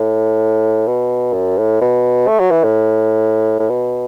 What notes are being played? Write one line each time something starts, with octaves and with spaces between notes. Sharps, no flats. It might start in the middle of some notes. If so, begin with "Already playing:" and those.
Already playing: A2
B2
F#2
A2
B2
A3
F#3
E3
A2
A2
B2